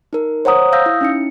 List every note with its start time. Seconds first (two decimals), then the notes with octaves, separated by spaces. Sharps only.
0.13 D#4 A#4
0.45 C5 C#5 F#5 A#5 D#6
0.73 F5 D#6 E6 G6 A#6
0.86 E4
1.01 C#4 D#4 C#7